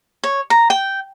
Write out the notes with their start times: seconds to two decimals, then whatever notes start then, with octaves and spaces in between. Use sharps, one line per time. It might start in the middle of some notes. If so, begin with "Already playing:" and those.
0.24 C#5
0.50 A#5
0.70 G5